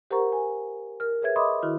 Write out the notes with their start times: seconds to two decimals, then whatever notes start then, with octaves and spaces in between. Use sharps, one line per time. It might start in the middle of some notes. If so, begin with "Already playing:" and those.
0.11 G4 A#4 C5 F#5 A#5 C#6
0.32 G#5
1.00 A#4 F6
1.22 G#4 B4 C#5 E5 G#6
1.36 D#5 E5 B5 C6 D6 D#6
1.62 D#3 E4 F#4 F6